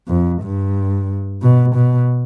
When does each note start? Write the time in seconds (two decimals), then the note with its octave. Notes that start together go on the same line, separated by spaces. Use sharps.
0.08 F2
0.42 G2
1.42 B2
1.75 B2